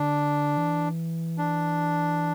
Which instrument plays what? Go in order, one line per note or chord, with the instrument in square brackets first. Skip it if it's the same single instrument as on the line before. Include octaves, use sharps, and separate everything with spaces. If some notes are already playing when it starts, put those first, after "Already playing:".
Already playing: [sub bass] D3 [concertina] D4
[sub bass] E3
[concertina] D4